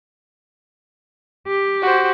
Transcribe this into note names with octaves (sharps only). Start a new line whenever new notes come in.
G4
F#4 C5